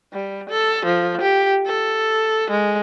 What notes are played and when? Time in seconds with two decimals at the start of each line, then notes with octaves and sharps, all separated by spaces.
0.13 G3
0.50 A4
0.85 F3
1.21 G4
1.67 A4
2.50 G#3